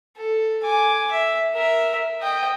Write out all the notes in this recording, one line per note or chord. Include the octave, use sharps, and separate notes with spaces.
A4
G#5 D6
E5
A#4 E5
D#5 G5